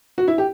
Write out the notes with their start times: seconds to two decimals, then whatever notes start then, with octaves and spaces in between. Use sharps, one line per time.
0.18 F#4
0.28 E4
0.38 G4